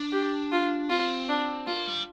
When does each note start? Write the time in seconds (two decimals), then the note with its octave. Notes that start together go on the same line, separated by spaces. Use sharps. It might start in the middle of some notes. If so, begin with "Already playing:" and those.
Already playing: D4
0.12 G4
0.52 F4
0.89 C4 F4
1.29 D4
1.67 A#3 F4
1.87 G3